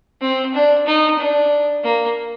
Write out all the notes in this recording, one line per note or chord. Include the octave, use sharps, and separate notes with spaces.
C4
D4
D#4
D4
A#3